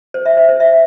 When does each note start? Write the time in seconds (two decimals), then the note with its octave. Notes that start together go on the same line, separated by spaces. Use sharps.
0.14 C5
0.25 E5
0.37 C5
0.49 C5
0.60 E5